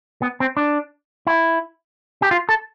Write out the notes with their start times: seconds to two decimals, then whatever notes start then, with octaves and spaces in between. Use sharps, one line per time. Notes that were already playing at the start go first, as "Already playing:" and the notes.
0.22 B3
0.40 C4
0.57 D4
1.27 E4
2.22 G4
2.31 F4
2.49 A4